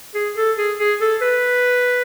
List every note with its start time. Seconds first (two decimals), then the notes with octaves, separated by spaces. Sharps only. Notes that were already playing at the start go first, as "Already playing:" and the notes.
0.15 G#4
0.37 A4
0.58 G#4
0.79 G#4
1.01 A4
1.22 B4